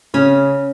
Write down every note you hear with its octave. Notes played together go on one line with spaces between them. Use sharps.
C#3 C#4